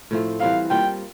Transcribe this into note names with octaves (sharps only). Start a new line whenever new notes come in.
A2 F3 A3 C4
E3 G3 C4 E4 F5
G3 A#3 F4 G5